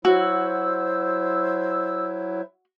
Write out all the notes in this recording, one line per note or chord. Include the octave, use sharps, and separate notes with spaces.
F#3 E4 F#4 C5 E6